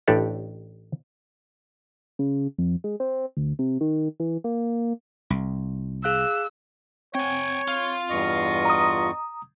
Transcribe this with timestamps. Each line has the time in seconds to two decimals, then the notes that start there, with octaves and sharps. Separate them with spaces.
0.08 A1 A2 D4 G4 A4 D5
2.19 C#3
2.58 F2
2.84 G#3
3.00 C4
3.37 D2
3.59 C3
3.81 D#3
4.20 E3
4.44 A#3
5.30 C2
6.04 G#4 F5 E6 F#6
7.15 C4 C#5 G5 G#5
7.68 F4
8.10 E2 G2 D#5 C#6
8.65 A#5 D#6